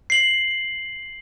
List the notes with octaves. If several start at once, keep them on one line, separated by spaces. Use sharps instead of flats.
C7 F#7